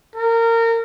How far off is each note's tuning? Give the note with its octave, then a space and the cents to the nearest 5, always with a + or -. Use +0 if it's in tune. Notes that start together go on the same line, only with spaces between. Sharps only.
A#4 -25